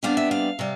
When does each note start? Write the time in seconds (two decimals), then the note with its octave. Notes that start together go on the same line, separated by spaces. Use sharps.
0.03 C3 G3 B3 D4 F5
0.17 E5
0.31 F5
0.59 C3 G3